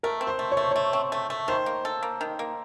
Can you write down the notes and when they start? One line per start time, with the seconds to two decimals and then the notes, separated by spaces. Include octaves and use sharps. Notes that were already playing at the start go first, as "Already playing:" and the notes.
0.03 A3 A#4
0.21 C4
0.27 C5
0.39 A3
0.52 C#5
0.57 A3 C5
0.71 A3 C#5
0.93 C4
1.12 A3
1.30 A3
1.48 D#3 C5
1.66 A#3
1.85 A4
2.03 A#3
2.21 D#3
2.39 A#3